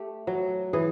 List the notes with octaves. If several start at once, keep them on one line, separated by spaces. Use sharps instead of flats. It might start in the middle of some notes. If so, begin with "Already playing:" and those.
Already playing: A3 G4
F#3
E3 G#4